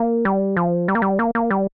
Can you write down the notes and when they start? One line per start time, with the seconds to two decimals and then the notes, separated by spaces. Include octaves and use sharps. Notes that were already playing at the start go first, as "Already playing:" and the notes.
Already playing: A#3
0.25 G3
0.57 F3
0.88 G3
0.95 A#3
1.02 G3
1.19 A#3
1.35 A#3
1.51 G3